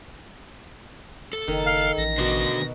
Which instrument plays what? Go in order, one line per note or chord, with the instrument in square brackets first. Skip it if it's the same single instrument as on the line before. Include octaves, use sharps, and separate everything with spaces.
[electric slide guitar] A4
[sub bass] F#1 [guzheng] D#3
[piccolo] F5
[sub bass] A1 [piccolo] A#6
[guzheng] B2 [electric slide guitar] D3 F#4